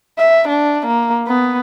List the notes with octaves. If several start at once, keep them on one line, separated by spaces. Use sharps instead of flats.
E5
D4
A#3
B3